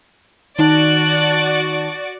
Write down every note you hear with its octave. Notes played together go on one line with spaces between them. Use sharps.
D#3 D#4 F#4 D5 A5 F#6